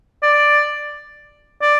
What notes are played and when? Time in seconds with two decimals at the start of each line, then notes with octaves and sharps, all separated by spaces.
0.23 D5
1.61 D5